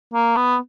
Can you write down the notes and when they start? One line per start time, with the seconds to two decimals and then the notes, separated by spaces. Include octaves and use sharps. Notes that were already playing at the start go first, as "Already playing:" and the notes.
0.14 A#3
0.37 B3